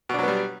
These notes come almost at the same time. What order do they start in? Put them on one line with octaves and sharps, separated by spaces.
B2 D4 F#3 B3 G3